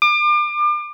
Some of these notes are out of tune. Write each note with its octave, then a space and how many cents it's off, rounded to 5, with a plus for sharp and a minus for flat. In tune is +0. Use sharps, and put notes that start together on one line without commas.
D6 +35